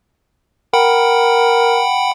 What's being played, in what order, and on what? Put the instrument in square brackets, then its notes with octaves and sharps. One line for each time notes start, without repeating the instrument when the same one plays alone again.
[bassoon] A#4 [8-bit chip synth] F#5 G5 B5